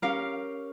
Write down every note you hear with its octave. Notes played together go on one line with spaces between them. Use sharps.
C#4 G4 A#4 F5